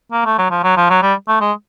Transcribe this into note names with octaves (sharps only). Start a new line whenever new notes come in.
A#3
A3
F#3
F3
F#3
F3
F#3
G3
A3
G#3